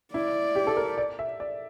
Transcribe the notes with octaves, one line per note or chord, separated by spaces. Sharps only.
E4 D5
G4
A4
A#4
D5
E5
D5